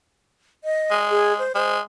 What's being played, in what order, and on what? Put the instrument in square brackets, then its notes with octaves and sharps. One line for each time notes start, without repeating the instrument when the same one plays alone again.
[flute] D#5
[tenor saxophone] G#3
[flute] G#4
C5
[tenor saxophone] G#3 [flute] C5